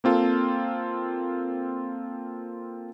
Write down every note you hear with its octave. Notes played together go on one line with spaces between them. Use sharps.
A#3 C4 F4 A4